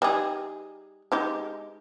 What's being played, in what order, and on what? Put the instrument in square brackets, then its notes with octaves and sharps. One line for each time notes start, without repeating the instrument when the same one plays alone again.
[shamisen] G3 D#4 G#4
G#3 D#4 G4